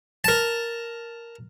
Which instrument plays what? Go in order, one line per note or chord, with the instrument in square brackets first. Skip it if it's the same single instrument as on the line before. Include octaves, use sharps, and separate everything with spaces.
[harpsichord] A#4 A5